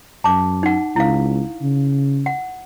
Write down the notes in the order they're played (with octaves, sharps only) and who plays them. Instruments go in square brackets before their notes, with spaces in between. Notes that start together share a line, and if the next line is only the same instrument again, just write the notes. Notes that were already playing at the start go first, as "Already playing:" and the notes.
[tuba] F#2 [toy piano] A5 D6
[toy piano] D#4 F#5
[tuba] C#2 [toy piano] E4 F5
[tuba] C#3
[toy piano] F#5